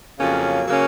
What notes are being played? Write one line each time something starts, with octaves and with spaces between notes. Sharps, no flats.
F2 C#3 F#3 A#3 C#4
C#3 F#3 A#3 C#4